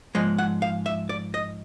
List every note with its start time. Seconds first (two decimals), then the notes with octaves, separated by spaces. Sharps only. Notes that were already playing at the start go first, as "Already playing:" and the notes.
0.15 G#2 F3 G#3 D#5
0.38 F#5
0.62 F5
0.86 E5
1.09 D5
1.34 D#5